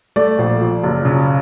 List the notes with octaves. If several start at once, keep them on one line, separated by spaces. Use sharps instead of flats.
A3 D5
A#1
F3
F#1
C#3